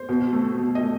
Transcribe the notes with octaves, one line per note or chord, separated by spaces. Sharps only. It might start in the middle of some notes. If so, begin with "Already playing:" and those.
Already playing: C5
B2
A3 C4
B2
D#5
A3